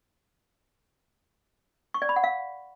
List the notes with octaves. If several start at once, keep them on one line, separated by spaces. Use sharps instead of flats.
C#6
D5
B5
F#5
F5